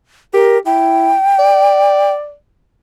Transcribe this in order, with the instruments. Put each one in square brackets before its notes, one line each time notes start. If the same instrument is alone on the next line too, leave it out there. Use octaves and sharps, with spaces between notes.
[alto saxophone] G4 [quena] A#4
[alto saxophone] E4 [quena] G5
[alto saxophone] D5